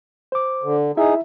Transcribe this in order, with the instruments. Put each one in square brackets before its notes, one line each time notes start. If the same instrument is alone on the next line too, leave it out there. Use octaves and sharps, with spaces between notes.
[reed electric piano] C5 D6
[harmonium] D3
[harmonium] D#4 G#4 [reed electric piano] E4 E5